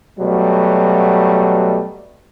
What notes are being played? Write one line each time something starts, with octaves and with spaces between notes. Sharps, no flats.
B2 F#3 G3 A3